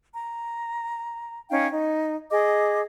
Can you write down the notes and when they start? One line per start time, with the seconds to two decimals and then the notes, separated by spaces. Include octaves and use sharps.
0.14 A#5
1.50 C#4 D#4 F5 G5
1.71 D#4
2.31 G#4 D#5 D6